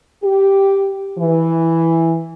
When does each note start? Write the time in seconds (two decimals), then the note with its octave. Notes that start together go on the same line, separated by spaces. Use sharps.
0.24 G4
1.18 E3